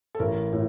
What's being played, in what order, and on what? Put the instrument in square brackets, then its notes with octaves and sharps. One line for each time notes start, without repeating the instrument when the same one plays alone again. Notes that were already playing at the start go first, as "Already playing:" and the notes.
[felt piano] A4
A1 A#4
A2